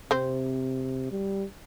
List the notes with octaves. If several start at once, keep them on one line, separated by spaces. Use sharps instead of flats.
C3 C4 C5
G3